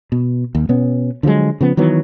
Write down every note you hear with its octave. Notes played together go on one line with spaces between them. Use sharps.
B2
D#2
B2 B3 C#4
D3 F3 F#3 G#3
C#3 F3 B3
D#3 E3 F#3 B3